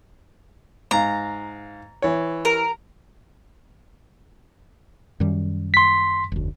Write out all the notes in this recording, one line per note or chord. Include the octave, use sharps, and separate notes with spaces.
G#2 F5 A#5
E3 C#5
A#4
F#2 D#3 G3
C6 B6
F1 D2